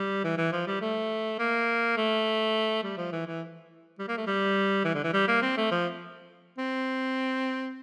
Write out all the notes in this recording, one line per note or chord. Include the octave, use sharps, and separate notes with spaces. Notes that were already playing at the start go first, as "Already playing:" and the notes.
Already playing: G3
E3
E3
F3
G3
A3
A#3
A3
G3
F3
E3
E3
G3
A#3
A3
G3
E3
D3
E3
G3
A#3
C4
A3
F3
C4